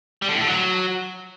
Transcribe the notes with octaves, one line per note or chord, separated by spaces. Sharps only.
G3
D3
A2
D3
F#3